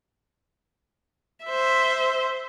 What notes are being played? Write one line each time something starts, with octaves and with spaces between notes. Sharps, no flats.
C5 E5